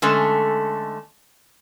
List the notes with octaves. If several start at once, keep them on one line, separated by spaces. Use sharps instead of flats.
D3 G#3 A3 C#4 A4